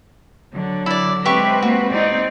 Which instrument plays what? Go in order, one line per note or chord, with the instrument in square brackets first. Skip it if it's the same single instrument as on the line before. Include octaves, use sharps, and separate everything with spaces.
[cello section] D3 [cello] F#3
[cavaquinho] E4 D5
[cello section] G#3 C4 B4 [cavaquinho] G4 E5 C#6
[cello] A#3 [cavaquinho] F#4
[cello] C4 D#4 [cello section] D5